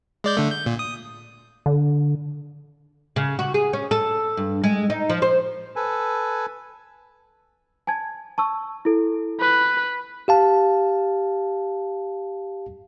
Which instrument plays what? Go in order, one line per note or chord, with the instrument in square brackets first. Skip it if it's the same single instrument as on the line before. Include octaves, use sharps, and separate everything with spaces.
[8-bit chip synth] G#3 D5 G6
D3 A3
G6
A#2
D#6
[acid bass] D3
[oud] C#3
F#4
G#4
C#4
A4
G2
G#3
D#4
F3
C5
[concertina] A4 B4 G#5
[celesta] G#5 A5 G#6
A5 C#6 E6
E4 A4
[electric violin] B4
[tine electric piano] G4 F5 A5